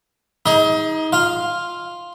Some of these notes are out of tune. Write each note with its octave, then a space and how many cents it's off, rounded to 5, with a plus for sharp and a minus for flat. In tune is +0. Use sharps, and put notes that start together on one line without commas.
D#4 +30 G#4 -15 D#5 +30
F4 +0 F5 +0